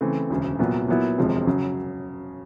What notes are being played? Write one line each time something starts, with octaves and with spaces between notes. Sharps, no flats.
C#3 E3 A3 C4
E1 D2 C#3
C2 A#2 F#3 B3
A#2 F#3 B3 E4
E1 D2 C3 F3 G#3
F#2 C#3 F#3